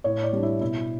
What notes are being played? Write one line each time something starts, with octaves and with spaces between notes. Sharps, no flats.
A2 C#5
D5
G3 D4
E4
B2 E4